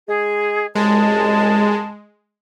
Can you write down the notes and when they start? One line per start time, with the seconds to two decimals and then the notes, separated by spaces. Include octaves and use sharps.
0.09 G#3 G#4
0.75 C2 F#2 G#3 A5